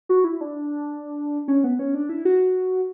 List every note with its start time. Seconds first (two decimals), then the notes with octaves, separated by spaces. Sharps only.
0.09 F#4
0.24 E4
0.41 D4
1.48 C#4
1.64 B3
1.79 C#4
1.94 D4
2.09 E4
2.25 F#4